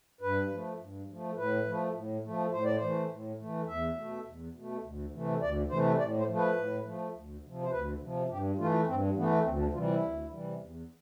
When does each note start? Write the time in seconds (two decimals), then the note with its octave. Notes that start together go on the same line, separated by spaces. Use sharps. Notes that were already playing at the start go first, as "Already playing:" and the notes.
0.21 G2 B4
0.50 F3 A3
0.79 G2
1.08 F3 A3
1.36 A2 B4
1.66 F3 A3
1.94 A2
2.23 F3 A3
2.52 A2 C5
2.64 D5
2.76 C5
2.81 E3 A3
3.09 A2
3.38 E3 A3
3.67 E2 E5
3.96 B2 A3
4.25 E2
4.53 B2 A3
4.83 D2
5.11 C3 E3 A3
5.40 D2 D5
5.69 C3 E3 A3 C5
5.98 A2 D5
6.18 C5
6.27 F3 A3
6.36 B4
6.56 A2
6.85 F3 A3
7.14 D2
7.43 C3 F3
7.62 C5
7.71 D2 B4
8.00 C3 F3
8.28 G2 G4
8.58 E3 A3 F4
8.86 G2 C4
9.15 E3 A3 B3
9.44 D2 C4
9.59 D4
9.73 C3 E3 G3 F4
9.88 E4
10.03 D2
10.31 C3 E3 G3
10.60 E2